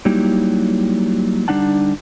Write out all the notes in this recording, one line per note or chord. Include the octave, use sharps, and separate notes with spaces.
F#3 G3 A#3 D#4 E4 G4
D3 G3 D4 D#4 F#5 A5